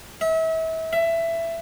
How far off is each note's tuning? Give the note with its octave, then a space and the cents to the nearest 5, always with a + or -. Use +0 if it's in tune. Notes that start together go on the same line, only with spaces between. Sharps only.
E5 -35
E5 +15